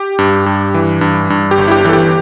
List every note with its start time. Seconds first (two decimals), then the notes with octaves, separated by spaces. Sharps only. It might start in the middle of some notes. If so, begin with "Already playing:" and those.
Already playing: G4
0.19 G2
0.46 G2
0.74 E3
1.01 G2
1.30 G2
1.51 G4
1.58 G1
1.68 E4
1.71 G4
1.85 E3 A4
1.93 G4